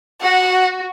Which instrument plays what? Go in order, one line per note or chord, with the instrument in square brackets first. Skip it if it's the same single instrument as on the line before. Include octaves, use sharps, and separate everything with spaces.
[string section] F#4 [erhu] F#5